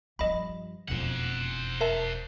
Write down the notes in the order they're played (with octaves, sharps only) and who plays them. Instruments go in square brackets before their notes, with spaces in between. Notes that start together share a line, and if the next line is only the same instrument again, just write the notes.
[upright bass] G2 F3 [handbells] D#5 B5
[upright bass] E1 F2 [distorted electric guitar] C5 F#5
[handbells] A#4 E5 A5